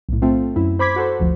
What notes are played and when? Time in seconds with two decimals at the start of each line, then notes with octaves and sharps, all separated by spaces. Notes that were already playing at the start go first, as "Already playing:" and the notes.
0.09 B1 A2
0.22 A3 C4 F4
0.56 F#2 E4
0.79 C5 B5 D6 G#6 B6
0.96 F#4 A4 C5
1.19 G1 D2 F3